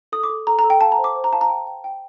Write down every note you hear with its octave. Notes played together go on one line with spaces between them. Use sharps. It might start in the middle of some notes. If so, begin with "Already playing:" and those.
A4 D#6
D6
A4
A4 A#5
A#5
A4
G5
F5 A5
A#5
C5
D6
C5
A#5
F5 A5
A#5
G5
G5
G5